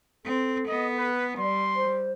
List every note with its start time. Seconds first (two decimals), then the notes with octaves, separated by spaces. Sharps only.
0.25 C4 A4
0.68 B3 D#5
0.98 B4
1.39 G3 D5 C6
1.76 C5